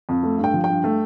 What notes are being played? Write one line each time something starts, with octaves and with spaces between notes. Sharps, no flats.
F2
A3
G2
G5
F3
G5
G2
A3